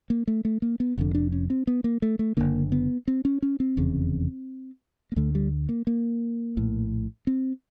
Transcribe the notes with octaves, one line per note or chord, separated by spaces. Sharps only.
A#3
A3
A3
A#3
B3
F1 F2 D3
D4
C#4
C4
B3
A#3
A3
A3
F#1 F2 D3 A#3
B3
C4
C#4
C#4
C4
F1 E2 C#3
A#3
D2 D3 A3
G3
A#3
A#3
A#1 A2
C4